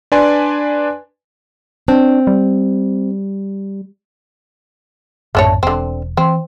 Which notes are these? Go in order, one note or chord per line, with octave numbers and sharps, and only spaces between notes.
D4 B4 D5 G#5 C6
C4 D4
G3
A#1 F#2 A2 A3 D4 C#5
E1 D3 C4
E3 C4